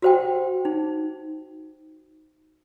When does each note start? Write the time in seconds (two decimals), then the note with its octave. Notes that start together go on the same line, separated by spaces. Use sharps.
0.02 F#4 G4 C5 F#5 G5
0.65 D#4